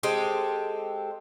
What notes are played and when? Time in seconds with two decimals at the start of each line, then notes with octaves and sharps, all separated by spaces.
0.03 G#3 C4 G4 A4